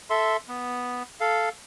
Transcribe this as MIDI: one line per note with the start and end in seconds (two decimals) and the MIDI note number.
0.10 0.37 69
0.10 0.37 76
0.10 0.37 84
0.48 1.03 59
1.20 1.49 69
1.20 1.49 77